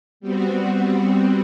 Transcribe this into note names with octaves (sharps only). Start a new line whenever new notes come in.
G3 B3 C4 F#4